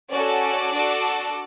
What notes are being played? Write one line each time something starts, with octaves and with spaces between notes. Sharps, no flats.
C#4 F#4 A4 D5
D4 F#4 A4